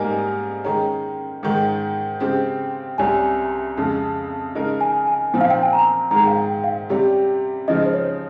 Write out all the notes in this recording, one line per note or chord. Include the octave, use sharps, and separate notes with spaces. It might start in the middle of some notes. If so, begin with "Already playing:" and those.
Already playing: G#2 G3 A#3 D#4 A#4 G#5
D#3 G#3 C#4 A#5
G#2 D#3 G#3
C#3 G#3 C4 G4
C2 C3 G3 C#4 G#5
F2 C#3 G#3
C#3 G#3 D#4 A#4
G#5
G#5
A#2 F3 C4
F5
G5
G#5
A#5
G#2 D#3 G#3 A#5
F5
G5
F5
C3 G3 C#4 G4
C#3 F3 G#3 D#4 D#5
C5
C#5